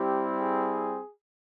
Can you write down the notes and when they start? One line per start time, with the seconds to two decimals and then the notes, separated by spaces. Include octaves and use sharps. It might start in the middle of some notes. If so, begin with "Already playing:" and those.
Already playing: G3 C4 E4 G4
0.40 G#4